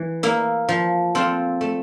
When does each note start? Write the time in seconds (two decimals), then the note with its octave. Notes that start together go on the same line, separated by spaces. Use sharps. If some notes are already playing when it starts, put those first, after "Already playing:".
Already playing: E3
0.23 A#3 E4
0.69 F3
1.15 C4 F4 A4
1.61 A3